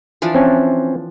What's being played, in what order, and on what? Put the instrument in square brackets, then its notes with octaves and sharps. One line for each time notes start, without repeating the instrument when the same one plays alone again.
[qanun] E3 F3 D4
[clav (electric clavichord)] C4 C#4